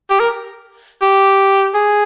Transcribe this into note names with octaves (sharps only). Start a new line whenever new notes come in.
G4
A#4
G4
G#4